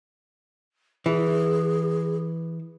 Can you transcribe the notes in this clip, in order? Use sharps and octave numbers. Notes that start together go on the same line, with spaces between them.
E3 G#4